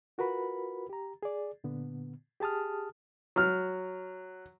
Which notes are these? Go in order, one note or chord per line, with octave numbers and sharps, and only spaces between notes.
F4 F#4 A#4 B4 B5
G4 A#5
G#4 D5
A#2 D3 B3
G4 G#4 A5 D#6 F6
F#3 F6